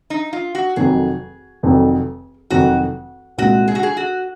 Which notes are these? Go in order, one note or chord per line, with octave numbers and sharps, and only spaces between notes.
D#4
F4
F#4
F1 F2 D#3 F#3 G#4
F1 F2 D#3 F#3
F1 F2 D#3 F#3 F#4
C2 A#2 G#3 F#4
G#4
F#4
G#4
F#4